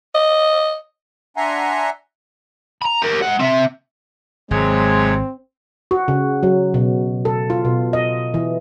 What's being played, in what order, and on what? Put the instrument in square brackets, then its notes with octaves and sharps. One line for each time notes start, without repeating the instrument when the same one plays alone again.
[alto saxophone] D#5
[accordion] D4 E5 F#5 G#5 A#5 C6
[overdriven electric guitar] A#5 B5
G4 A#4
G#3 F#5
C4 E5
[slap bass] G#1 [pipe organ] C3 F#3 C#5 [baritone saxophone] G#3 [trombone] C4
[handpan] F#4
C#3
F#3
B2
A4
F4
B2
D#5
E3